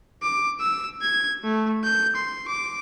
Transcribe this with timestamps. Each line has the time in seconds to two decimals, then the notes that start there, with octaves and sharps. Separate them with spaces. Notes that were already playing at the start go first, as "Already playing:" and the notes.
0.23 D6
0.60 E6
1.01 G#6
1.44 A3
1.84 G6
2.15 C6
2.48 D6